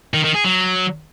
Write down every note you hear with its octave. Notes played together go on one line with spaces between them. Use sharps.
D#3
D#3
G#4
F#3